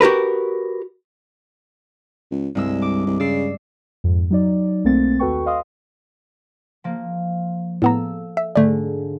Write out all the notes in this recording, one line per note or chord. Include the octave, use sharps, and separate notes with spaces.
F#4 G4 A#4 B4
C#2
C2 G2 G#3 E6
D6
C2
C#3 D5 E6 C7
F2 G#2
F#3 D#4 D5
B1 A3 A#3 C4 A6
D#2 F#4 A4 B4 G5 C#6
D#5 F5 C6 D#6
F3 A#3
A2 B3 A4 A#5 E6
E5
G#2 D3 A3 D5